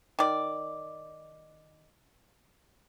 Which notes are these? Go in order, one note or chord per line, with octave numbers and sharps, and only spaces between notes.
D#3 D5